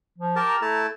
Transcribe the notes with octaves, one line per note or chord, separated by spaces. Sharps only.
F3
G4 A#4 A5
A#5
A3 E4 A5